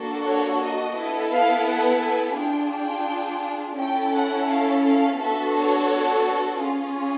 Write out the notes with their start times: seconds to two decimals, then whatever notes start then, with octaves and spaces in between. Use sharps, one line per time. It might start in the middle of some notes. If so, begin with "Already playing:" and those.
Already playing: A#3 D4 F#4 A4
0.27 C#5
0.62 D#5
0.97 B3 E4 A4
1.32 F5
1.68 F#5
2.03 G#5
2.38 D4 F4 G#4 G5
2.73 G5
3.79 C#4 E4 A4 G5
4.15 F#5
4.50 F5
4.86 F5
5.20 B3 D4 F#4 A4 E5
5.56 C#5
6.62 C#4 F4 G#4